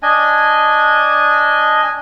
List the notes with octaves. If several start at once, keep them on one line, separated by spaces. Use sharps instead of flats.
D4 D#5 G#5